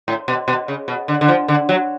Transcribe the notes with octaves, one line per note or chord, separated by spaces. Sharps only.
A2
B2
B2
C#3
B2
D3
D3
F3
D3
F#3